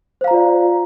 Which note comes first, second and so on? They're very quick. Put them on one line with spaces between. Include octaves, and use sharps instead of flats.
C5 F5 A#5 F4 D5